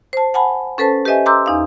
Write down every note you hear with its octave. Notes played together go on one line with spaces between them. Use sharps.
C5 A5
F#5 G#5 A5 B5
C#4 A4 B4 C5 A5
G4 B4 C5 D#5 E5 G#5
A#5 C6 D6 E6 G6
E2 D#4 F5